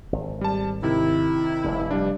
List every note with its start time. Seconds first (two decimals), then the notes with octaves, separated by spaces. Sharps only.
0.13 G#1
0.41 G3 A5
0.83 C3 D#3 E4
1.64 F1 G2
1.91 G3 D4